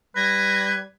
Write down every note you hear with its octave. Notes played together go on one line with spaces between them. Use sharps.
G3 B4 G#6 A#6